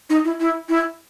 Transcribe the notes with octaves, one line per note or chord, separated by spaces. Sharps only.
D#4
E4
E4
E4